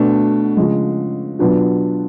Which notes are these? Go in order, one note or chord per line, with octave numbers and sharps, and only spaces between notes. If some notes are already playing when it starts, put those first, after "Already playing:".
Already playing: B2 A3 D4
C#3 F3 G#3
B2 F#3 B3 D4 F4